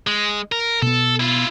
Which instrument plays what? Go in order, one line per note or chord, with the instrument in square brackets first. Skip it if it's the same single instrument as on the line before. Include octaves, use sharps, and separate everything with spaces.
[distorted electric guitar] G#3
A#4
[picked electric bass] B2 B3 [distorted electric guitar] A4
[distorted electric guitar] E4 F4